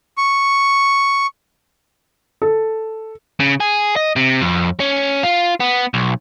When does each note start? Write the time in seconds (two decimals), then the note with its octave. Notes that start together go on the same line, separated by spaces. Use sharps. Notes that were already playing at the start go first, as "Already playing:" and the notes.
0.17 C#6
2.42 A4
3.40 C#3
3.60 G#4
3.96 D#5
4.16 C3
4.41 F2
4.80 C#4
5.23 F4
5.60 B3
5.94 B1